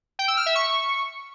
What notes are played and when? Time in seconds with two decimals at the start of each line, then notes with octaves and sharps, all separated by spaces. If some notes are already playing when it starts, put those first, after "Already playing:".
0.19 G5
0.28 E6
0.37 F6
0.46 E5
0.55 C#6